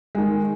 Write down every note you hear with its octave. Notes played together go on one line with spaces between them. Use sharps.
D#3 G#3